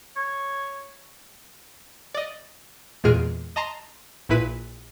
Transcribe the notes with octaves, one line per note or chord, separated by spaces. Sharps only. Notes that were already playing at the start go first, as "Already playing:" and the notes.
C#5
D5 D#5
E2 A#2 G#3 G#4 F6 D7
D#5 A5 A#5 C6
A#1 A#2 E4 B4 B6 D#7